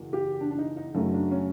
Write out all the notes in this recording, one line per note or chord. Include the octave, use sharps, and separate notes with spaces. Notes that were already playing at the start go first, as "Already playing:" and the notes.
Already playing: F#1 E2 B2
G4
D4
D4
D#4
D#4
F#2 C#3 F#3 A3
D4
C#4